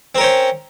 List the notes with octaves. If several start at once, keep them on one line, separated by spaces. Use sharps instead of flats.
C4 C#4 A#4 C5